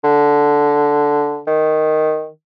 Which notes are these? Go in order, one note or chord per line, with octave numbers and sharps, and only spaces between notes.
D3
D#3